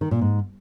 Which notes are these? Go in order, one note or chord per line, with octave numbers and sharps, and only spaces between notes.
D#3
A#2
G#2